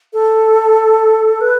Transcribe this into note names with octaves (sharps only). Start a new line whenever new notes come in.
A4
B4